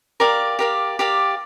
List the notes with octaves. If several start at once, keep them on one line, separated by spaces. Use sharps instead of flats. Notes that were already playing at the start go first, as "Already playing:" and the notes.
G4 A#4 D5 F5
G4 A#4 D5 F5
G4 A#4 D5 F5